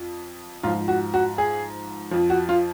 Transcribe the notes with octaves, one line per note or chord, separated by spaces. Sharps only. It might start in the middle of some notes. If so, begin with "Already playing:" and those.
Already playing: F2
G#2 F3 F4
F#4
F#4
G#4
F2 F3
F#4
F4